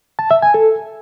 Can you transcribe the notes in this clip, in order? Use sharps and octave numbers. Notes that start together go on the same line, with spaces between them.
A5
E5
G#5
A4